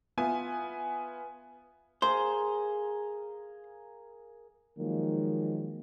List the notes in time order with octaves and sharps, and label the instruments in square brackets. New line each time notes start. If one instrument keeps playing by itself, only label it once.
[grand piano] B3 F4 E5 G#5
[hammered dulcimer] G#4 A#4 F5 [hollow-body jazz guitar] C5
[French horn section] D#3 F3 F#3 G#3 A#3